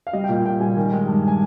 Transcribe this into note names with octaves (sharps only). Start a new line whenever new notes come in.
F5
G3 D#5
G5
A#2
G5
A#2 G5
G3 G#5
D#3
G#3
G2
G#5